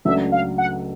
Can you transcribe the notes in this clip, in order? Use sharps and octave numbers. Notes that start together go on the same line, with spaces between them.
C#2 C#3 F#3 A3 D4 E5
F5
F#5